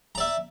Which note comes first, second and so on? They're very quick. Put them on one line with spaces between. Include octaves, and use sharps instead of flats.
A#5 D5 E5